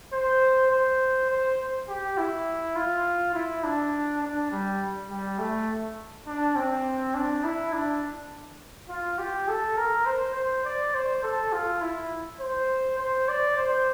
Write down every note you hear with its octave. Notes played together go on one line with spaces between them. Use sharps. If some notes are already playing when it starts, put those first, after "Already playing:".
C5
C5
C5
G4
E4
F4
E4
D4
D4
G3
G3
A3
D4
C4
D4
E4
D4
F4
G4
A4
A#4
C5
C5
D5
C5
A4
F4
E4
C5
C5
D5
C5